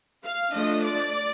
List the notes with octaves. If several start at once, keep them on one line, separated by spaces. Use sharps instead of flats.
F5
F3 A3 D4 D#5
D5